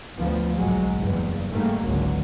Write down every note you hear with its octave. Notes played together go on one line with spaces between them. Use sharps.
D2 F3 B3
B1 G#2 F#3 G#3
F#1 E2 G2
G#2 D#3 G3 A3 A#3
G#1 C#2 D3 F#3